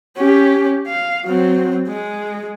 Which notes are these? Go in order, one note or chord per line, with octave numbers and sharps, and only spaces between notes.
C#4 G4
F5
F#3 C4
G#3